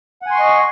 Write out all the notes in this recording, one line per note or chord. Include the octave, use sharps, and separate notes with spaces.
D#5 F#5 G#5 C6 C#6